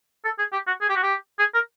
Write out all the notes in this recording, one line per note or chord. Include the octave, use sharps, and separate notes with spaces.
A4
G#4
G4
F#4
G#4
G4
F#4
G4
G#4
A#4